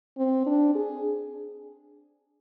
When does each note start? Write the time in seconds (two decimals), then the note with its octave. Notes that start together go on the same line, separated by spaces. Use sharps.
0.18 C4
0.46 D4
0.75 G#4